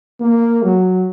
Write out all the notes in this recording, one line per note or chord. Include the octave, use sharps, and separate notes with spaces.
A#3
F#3